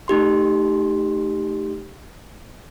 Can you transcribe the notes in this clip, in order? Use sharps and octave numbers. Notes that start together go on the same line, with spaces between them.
A3 D#4 G4 C6